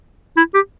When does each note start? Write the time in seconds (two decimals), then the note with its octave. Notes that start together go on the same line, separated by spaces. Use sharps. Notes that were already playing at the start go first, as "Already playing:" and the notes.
0.37 E4
0.54 G4